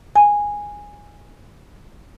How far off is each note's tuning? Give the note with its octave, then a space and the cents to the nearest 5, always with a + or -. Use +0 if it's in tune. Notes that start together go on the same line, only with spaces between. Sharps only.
G#5 -10